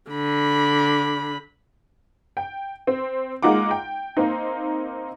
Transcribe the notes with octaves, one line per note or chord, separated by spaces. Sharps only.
D3 B5
G5
C4
G#3 A#3 D#4 F4 F#5 D6
G5
A#3 C4 D#4